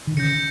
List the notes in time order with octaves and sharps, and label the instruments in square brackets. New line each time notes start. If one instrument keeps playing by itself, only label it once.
[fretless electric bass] D#3
[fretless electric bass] C#3 [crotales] G6 A#6 C#7